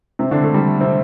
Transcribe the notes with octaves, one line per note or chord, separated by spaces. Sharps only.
C3 C4
D3 D4
A3
G3
C3 C4